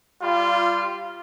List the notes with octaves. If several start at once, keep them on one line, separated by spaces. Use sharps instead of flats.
G3 F4